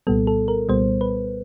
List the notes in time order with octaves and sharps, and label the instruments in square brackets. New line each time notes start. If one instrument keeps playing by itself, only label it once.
[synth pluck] C2 A#2 G3 B3 A4
A4
A#4
C2 A#2 G3 B3 C5
B4